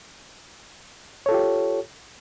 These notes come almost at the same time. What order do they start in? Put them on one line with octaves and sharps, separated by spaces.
C#5 A4 F4 G4